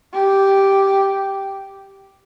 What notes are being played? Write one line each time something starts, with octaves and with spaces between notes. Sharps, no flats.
G4